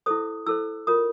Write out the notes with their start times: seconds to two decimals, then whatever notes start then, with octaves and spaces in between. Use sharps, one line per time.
0.06 E4 A4 C5 D#6
0.47 E4 A4 C5 E6
0.87 F4 A#4 C#5 D#6